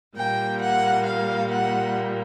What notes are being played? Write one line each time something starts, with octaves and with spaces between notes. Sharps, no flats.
A#2 G3 A#3 G5
F#5
F5
F#5